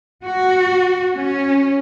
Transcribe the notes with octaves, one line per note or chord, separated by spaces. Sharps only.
F#4
C#4